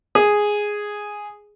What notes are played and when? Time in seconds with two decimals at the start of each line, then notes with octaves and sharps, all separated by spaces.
0.15 G#4